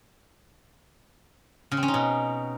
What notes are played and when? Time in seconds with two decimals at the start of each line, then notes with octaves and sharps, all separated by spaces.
1.72 C#3
1.77 C4
1.83 C#4
1.88 D#4
1.94 B2